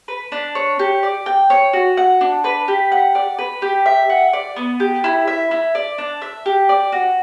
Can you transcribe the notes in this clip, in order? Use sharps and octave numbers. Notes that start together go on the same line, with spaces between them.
B4
D4
C#5
G4
D5
G5
C#5
F#4
F#5
D4
B4
G4
F#5
D5
B4
G4
E5
F#5
D5
B3
G4
E4
E5
E4
D5
D4
E5
G4
D5
F#4